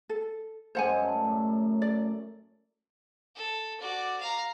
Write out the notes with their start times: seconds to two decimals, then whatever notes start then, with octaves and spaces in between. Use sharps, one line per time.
0.09 A4
0.75 F#2 G#3 A#4 C5 F#5 G#5
1.01 A3 C#4 D5
1.24 A2
1.82 D5
3.36 A4
3.81 F#4 D5
4.20 F5 A#5